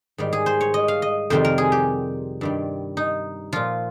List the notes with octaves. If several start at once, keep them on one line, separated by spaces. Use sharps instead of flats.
G#2 D#3 G3
G#4
C5
C#5
D#5
F5
D#5
F2 C3 D#3 G3 C5
A#4
G#4
G4
G2 D#3 G3
D#4
A#2 F3 F4